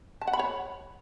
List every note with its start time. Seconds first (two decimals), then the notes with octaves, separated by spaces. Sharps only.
0.21 A5
0.27 F#5
0.33 B5
0.39 C#5